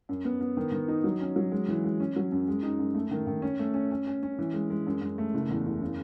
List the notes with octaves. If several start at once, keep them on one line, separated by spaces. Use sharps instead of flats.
F#2
B3
B3
D#3
D#3
D#4
F#3
C#4
F#3
G#3
E3
G#3
C#4
F#3
F#2
G#3
D#4
F#2
A3
D#3
D#3
C#4
A3
C#4
C#4
C#4
C#4
E3
G#3
G#3
F#2
F#2
A3
F#1
E2
F#1
C#3